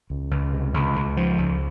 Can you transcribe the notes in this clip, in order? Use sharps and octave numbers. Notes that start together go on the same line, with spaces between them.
C#2
C#2
C3
C#2
C#2
F3
C#2